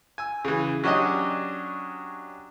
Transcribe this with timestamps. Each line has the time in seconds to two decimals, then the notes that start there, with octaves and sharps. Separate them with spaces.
0.18 G#5 E6
0.45 C#3 E3
0.84 F#3 C#4 D4 G4 D#5